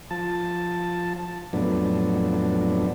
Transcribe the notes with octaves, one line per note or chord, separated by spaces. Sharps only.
F3 A5
F2 A2 F#3 B3 D4